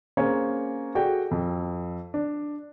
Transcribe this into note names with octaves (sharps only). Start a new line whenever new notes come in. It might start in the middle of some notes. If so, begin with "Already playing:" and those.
A#3 C4 C#4 G#4 C#5
F#4 G#4 A4 D5 G5
F2
D4